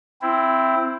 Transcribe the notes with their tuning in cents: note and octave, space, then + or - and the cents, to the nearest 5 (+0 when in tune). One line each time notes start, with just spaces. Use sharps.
C4 +0 E4 +10